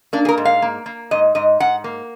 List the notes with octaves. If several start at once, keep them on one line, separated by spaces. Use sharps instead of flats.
A#3 D4
G#4
A#4
G#2
F5
A#3
A#3
G#2 D#5
G#2 D#5
G#2 F#5
A#3